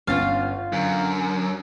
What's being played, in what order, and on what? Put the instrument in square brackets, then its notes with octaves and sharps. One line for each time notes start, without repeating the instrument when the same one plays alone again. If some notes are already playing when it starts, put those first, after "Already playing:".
[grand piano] G1 C#4 A6 [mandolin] F4 F5
[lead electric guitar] F#2 [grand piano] D3